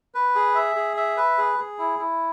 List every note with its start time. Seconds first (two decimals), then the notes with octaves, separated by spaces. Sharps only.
0.15 B4
0.35 G#4
0.55 E5
0.75 G#4
0.97 E5
1.17 B4
1.38 G#4
1.58 G#4
1.78 E4
1.99 E4